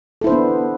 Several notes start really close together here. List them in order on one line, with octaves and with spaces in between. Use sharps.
A4 E4 C5 D4 B3